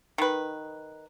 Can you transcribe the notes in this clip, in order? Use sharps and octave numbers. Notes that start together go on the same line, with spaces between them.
D#3 B4